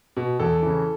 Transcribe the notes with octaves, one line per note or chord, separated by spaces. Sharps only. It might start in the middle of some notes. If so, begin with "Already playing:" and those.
B2
E2 A4
C#3 E3